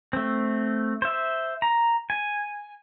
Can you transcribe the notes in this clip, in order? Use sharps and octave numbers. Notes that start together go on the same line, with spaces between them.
A3 C4
C5 E5
A#5
G#5